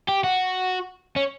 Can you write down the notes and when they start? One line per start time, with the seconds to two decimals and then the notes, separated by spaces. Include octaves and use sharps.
0.09 G4
0.24 F#4
1.16 C#4